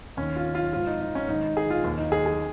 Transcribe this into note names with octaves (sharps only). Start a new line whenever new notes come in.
D#2 D#3 C#4
F4
F4
G#2 F3 F4
D#4
D#4
C#4
G#2 D#3 D#4
G#4
F4
D#2 D#3
D#4
G#4
G#4